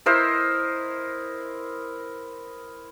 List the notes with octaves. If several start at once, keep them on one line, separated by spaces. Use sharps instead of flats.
E4 A#4 C5 D#5